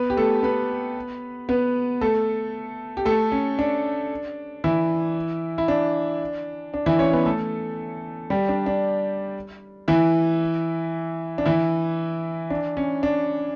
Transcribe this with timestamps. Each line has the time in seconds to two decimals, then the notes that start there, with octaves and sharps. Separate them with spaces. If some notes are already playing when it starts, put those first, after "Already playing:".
Already playing: B3 B4
0.10 G4
0.17 A3 A4
0.43 B3 B4
1.49 B3 B4
2.01 A3 A4
2.97 G4
3.05 A3 A4
3.32 C#4
3.59 D4
4.64 E3 E4
5.58 E4
5.68 D4
6.74 D4
6.86 E3 E4
6.99 C#4 C#5
7.13 B3 B4
7.26 A3 A4
8.30 G3 G4
8.49 D4
8.66 D4
9.88 E3 E4
11.38 D4
11.45 E3 E4
12.50 D4
12.77 C#4
13.03 D4